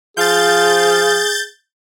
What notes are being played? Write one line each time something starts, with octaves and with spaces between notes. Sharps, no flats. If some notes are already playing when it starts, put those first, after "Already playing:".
F3 G#4 F5 G6 A6